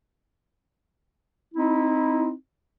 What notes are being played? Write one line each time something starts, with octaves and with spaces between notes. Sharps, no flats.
C4 D#4 E4